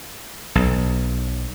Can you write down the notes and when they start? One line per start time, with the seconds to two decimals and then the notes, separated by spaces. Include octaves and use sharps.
0.55 B1